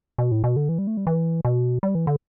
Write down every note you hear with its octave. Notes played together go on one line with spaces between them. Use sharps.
B2
A2
B2
D3
E3
G3
A3
G3
E3
B2
G3
E3
D3